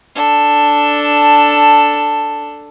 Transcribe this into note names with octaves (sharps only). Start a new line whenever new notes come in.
D4 A4